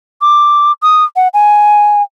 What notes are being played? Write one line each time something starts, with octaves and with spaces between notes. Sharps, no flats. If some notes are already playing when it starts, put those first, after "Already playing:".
D6
D#6
F#5
G#5